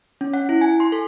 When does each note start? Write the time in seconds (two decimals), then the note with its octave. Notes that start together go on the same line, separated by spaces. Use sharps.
0.21 C#4
0.34 F#5
0.49 E4
0.61 G#5
0.80 C6
0.92 A4